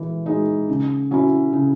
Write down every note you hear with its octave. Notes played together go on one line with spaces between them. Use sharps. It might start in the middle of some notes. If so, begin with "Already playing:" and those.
Already playing: E3 G#3
G#3 D#4
C#3
F#3 C#4 E4
C#3